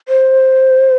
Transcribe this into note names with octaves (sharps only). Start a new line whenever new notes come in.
C5